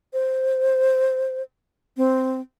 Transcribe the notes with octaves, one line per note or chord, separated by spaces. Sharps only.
C5
C4